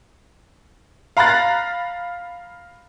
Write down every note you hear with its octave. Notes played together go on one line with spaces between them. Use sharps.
F5 A#5 B5 F#6 A6